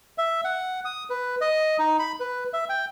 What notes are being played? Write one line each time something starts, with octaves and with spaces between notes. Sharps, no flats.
E5
F#5
D#6
B4
D#5
D#4
B5
B4
E5
G5